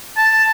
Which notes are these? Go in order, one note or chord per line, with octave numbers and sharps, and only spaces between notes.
A5